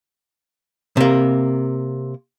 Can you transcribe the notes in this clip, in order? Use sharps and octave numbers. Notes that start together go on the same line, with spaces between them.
C3 A#3